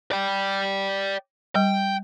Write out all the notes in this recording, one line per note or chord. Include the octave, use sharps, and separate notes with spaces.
D5 G5
G3 G5